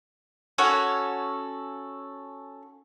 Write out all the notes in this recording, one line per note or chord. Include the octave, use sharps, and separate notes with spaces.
C#4 F#4 A4 C#5